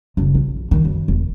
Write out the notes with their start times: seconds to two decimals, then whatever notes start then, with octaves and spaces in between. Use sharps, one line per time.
0.17 F#1 D4
0.35 A#1
0.71 D#3
0.85 F#2
1.08 E1